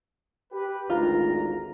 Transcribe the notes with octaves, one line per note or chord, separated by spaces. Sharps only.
G4 B4
G#1 D2 F4 A#5